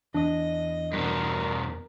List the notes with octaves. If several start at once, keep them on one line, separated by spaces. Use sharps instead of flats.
E2 E3 D4 D#5
G2 B2 A#4